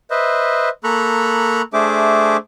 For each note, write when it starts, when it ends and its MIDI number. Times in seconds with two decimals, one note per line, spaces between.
0.11 0.69 71
0.11 0.69 72
0.11 0.69 75
0.11 0.69 76
0.84 1.62 58
0.84 1.62 69
0.84 1.62 82
0.84 1.62 83
0.84 1.62 85
0.84 1.62 90
1.73 2.37 57
1.73 2.37 62
1.73 2.37 68
1.73 2.37 72
1.73 2.37 76
1.73 2.37 86